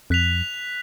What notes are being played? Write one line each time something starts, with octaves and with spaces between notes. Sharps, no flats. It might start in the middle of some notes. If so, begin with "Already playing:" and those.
F2 F#6 B6 F7